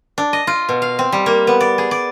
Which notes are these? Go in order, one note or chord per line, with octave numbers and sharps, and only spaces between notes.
D4
D#5
F4
B2
F5
C4
G3
A#3
B3
D5
G#4
D5